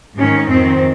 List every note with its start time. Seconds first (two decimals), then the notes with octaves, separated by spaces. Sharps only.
0.16 G#2 D#3 C#4
0.48 F2 D#3 C4